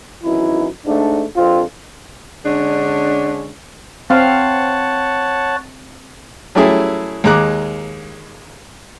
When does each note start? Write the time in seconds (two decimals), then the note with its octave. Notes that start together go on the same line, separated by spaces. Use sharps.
0.23 G#1 F#2 E3 D#4 E4
0.85 G#2 A3 D4
1.36 A#1 F2 C4 F4
2.45 D3 G#3 C#4 D4
4.10 C4 C#5 F5 F#5 A5
6.55 F#3 G3 A3 C#4 E4 G#4
7.24 D#2 G#3 A#5 D6 F#6